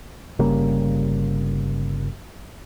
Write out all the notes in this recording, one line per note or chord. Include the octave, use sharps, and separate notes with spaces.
G1 C#3 G3 A#3